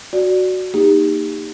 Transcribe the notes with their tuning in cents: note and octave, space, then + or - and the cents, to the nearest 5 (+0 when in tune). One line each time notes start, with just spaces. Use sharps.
F#4 +0 D5 +0
A#3 -10 D#4 +0 G4 +30